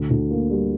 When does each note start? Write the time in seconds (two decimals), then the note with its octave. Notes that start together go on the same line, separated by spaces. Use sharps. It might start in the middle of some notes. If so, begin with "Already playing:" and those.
Already playing: D2
0.10 D2
0.31 A#3
0.51 G3